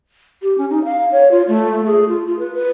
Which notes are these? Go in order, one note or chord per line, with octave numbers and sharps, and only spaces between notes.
G4
C#4
D#4
F5
C#5
F4
A3
G#4
F4
F4
B4
B4